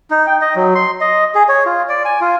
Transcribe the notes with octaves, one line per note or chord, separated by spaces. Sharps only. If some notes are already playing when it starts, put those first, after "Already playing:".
D#4
G5
D#5
F#3
C6
D#5
G#4
C#5
F4
D5
G#5
F4